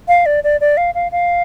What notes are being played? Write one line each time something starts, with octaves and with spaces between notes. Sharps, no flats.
F5
D5
D5
D5
F5
F5
F5